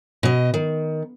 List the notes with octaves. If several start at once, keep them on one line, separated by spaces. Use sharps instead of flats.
B2 D#5
D#3